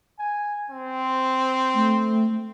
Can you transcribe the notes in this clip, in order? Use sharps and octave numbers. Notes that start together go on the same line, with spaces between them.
G#5
C4
A3